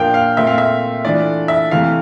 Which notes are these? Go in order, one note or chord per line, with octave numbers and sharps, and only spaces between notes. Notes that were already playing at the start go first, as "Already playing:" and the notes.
Already playing: A#2 F3 A#3 D4 F5 G5
F5
A#2 A3 C4 E5
F5
E5
E3 A3 D4 F4 D5
E5
C3 E3 A3 F5